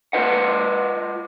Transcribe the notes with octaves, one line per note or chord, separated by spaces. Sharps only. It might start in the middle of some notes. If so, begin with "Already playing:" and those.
F4 B4 D#5 F#5